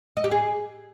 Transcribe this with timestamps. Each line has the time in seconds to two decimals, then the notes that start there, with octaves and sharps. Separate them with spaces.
0.17 D#5
0.24 G4
0.31 G#4